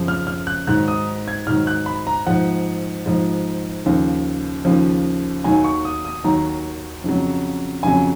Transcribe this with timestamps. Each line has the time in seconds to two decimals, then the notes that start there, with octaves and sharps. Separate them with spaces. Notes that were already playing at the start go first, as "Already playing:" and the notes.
Already playing: F#2 C#3 F3
0.08 F6
0.27 F6
0.47 F#6
0.67 G#2 D#3 F#3 F#6
0.88 D#6
1.28 G#6
1.47 G#2 D#3 F#3 F6
1.67 F#6
1.86 B5
2.07 A#5
2.27 G#2 F3 F#5
3.06 G#2 F3
3.86 D#2 C#3 F3
4.65 D#2 C#3 F3
5.44 D#2 D#3 F#3 G#5
5.64 C#6
5.85 D#6
6.05 D#6
6.24 D#2 D#3 F#3 A#5
7.04 F2 C#3 F#3
7.83 F2 C#3 F#3 G#5